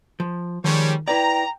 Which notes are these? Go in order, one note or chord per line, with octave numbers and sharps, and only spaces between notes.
F3
D#3 F3 G3 G#3 C#5
E4 B4 D5 G5 A#5